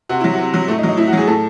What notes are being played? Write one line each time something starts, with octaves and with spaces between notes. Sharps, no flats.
C3 F#4
F#3 E4
C3 F#4
F#3
A2 A3
D#4
F#3
D#4
A2 E4
F#4
F#3 G#4
A2 A4